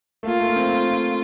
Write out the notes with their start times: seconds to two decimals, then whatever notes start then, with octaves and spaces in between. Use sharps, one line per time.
0.23 A3
0.26 A#3 F4
0.39 A3
0.47 A#3
0.56 C4